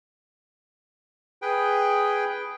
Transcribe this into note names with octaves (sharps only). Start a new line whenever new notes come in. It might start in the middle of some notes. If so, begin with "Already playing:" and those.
G#4 B4 G5